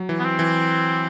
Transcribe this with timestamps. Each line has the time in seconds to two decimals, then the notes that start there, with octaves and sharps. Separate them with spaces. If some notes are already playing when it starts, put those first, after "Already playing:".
Already playing: F#3
0.09 E3
0.19 B3
0.24 C4
0.39 E3